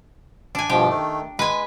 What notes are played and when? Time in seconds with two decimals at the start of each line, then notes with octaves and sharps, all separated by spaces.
0.55 D4 G#5
0.70 G2 B2 F3 G4
0.89 D#3 A3
1.39 G#3 B4 G#5